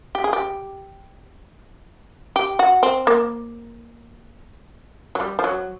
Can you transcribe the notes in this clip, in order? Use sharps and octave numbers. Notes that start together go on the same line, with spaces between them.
G4
G#4
G4
G4
F#4
C4
A#3
F#3
G3
F3
F#3